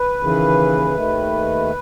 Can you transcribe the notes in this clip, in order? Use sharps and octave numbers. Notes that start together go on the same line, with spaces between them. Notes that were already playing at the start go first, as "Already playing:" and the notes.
Already playing: B4
D#2 C#3 E3
D#2 D#3 A3